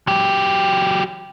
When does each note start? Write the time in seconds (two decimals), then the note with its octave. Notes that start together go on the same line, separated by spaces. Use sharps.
0.07 F#3 G4